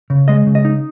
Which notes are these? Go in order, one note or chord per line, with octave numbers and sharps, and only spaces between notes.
C#3
G#3 D#5
C#3
D#5
D#4